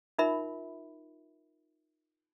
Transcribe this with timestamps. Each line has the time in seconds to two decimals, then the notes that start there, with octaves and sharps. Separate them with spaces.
0.19 D#4 F4 A#4 E5 B5